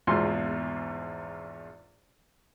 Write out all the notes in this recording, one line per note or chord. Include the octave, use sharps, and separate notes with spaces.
A#1 E2 G#2 B2 F4 C6